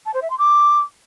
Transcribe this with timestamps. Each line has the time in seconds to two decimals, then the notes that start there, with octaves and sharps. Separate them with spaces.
0.05 A5
0.13 C5
0.22 E5
0.30 C6
0.38 D6